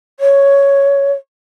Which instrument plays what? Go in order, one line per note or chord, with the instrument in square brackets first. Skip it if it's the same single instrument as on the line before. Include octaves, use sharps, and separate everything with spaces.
[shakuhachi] C#5